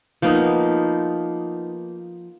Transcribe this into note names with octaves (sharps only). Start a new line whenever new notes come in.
F3 A#3 B3 D#4